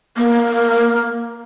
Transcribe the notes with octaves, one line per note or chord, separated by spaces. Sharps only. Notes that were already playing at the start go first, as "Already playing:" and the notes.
A#3